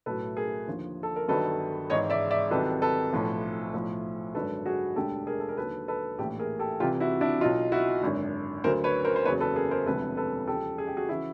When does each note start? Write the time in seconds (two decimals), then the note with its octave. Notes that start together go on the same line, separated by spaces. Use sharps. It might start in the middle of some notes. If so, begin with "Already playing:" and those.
0.06 B1 A2 F#3 A4 B4
0.37 G#4 A#4
0.67 D#2 D3 F3
1.03 A4
1.16 A#4
1.28 G1 G2 D#3 F#3 A4 B4
1.90 G#1 G#2 E3 C#5 D#5
2.10 D5 E5
2.31 D5 E5
2.51 C2 C3 D#3 F#3 A4 B4
2.82 A4 B4
3.12 B1 A2 F3
3.74 B1 A2 F3
4.34 G#1 F#2 D3 F#3 A4 B4
4.66 F#4 G#4
4.96 E1 D2 D3 G4 A4
5.27 G#4 A#4
5.40 A4
5.49 A#4
5.58 D#2 D3 F#3 A4 B4
5.88 A4 B4
6.19 A#1 A2 E3 G4 A4
6.39 G#4 A#4
6.59 G4 A4
6.80 C2 C3 E3 F4 G4
7.00 E4 F#4
7.21 D4 E4
7.41 B1 B2 F#3 D#4 F4
7.72 E4 F#4
8.03 G#1 F#2 D3
8.64 D2 D3 F#3 A#4 C5
8.84 B4 C#5
9.05 A#4 C5
9.16 C5
9.25 F#1 E2 C#3 F#3 B4 C#5
9.40 A4 B4
9.56 G#4 A#4
9.71 A#4 C5
9.86 E1 D2 C3 F3 A4 B4
10.17 A4 B4
10.48 E2 C#3 F3 G4 A4
10.78 G#4
10.87 G4
10.96 F#4 G#4
11.09 C#3 E3 E4 F#4